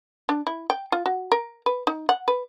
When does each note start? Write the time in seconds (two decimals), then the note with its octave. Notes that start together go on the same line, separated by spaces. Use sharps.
0.29 D4
0.47 E4
0.70 G5
0.92 F4
1.06 F#4
1.32 A#4
1.66 B4
1.87 D#4
2.09 F#5
2.28 B4